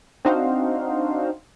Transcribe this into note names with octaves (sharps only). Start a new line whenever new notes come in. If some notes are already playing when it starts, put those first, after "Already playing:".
C4 D4 D#4 F#4 C5 F5